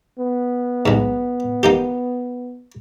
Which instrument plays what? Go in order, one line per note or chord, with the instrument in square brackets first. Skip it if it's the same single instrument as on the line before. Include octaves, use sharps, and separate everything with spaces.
[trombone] B3
[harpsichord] B1 G#2
A#3 D#4 G4